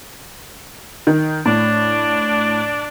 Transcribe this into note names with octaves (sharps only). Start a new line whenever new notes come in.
D#3
A2 D4